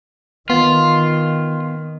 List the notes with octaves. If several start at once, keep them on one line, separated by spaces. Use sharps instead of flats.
D#3 B3 F4